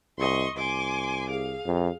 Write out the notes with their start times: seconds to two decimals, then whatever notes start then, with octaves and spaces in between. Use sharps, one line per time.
0.18 C2 D#5 C6 C#6
0.56 C2 G#5 C6 D6
1.29 G#4 F5
1.65 F2